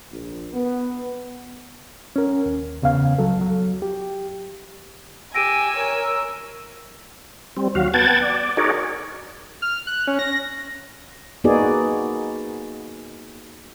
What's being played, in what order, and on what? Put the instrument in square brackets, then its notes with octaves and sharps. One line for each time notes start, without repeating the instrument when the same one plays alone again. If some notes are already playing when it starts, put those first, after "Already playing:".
[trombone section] A#1
B3
[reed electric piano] C#4 A#4
D#2
E2 C#3 B3 F5
C#2 F#3 A4
F#3
G4
[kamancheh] G4 [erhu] G#5 [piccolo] E6 [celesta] A#6 D7 D#7
[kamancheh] A#4 C#5
[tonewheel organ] G3 C4
D#2 F#3 F#4 F5
B3 F#5 G5 A5 G#6 A6
D5
D#4 F#4 G#4 A#4 C#5 D5
[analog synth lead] F6
F#6
C#4
A#6
[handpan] A#3 B3 D#4 F#4 G#4 D5